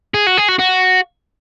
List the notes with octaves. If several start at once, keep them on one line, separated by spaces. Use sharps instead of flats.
G#4
F#4
G#4
F#4
F#4